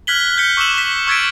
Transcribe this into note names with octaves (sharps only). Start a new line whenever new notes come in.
F6 F#6 G#6 B6 F#7 G7
G6 B6 C#7
C#6 D6 E6 F#6 E7 F#7
B6
C#6 E6 G#6 A6 B6 D7